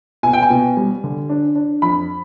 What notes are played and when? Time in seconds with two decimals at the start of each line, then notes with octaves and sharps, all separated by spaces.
0.23 B2 G#5
0.33 G5
0.42 G#5
0.50 B2
0.77 G3
1.04 D3
1.29 D4
1.55 D4
1.82 F2 B5